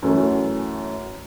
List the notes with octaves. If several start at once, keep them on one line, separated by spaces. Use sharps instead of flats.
F#2 E3 A3 C#4 F#4